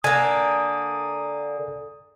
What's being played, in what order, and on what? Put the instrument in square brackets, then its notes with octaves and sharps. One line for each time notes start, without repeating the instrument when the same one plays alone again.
[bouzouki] D3 A#3 [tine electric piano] G#5 [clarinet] D#6